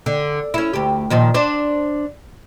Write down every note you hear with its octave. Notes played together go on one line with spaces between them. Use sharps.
D3
C#4 E4
D2 G4
A#2 D#3 F3
D4 C5